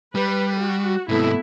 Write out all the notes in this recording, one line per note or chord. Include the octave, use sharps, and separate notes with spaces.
G3 B4
F#4
G#2 C3 A3 B3 E4